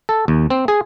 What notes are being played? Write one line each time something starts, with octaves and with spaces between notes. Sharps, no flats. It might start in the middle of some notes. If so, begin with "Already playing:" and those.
A4
D#2
C4
G#4